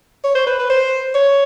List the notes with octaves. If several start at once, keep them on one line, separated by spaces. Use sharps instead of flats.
C#5
C5
B4
B4
C5
C#5